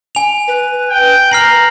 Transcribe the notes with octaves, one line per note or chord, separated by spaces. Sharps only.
G#5 F7
B4
G5
A#5 F6 C7 F#7